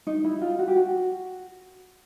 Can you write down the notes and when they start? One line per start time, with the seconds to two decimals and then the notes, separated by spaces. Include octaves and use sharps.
0.07 D#4
0.24 E4
0.41 F4
0.59 F#4
0.68 G4
0.76 F#4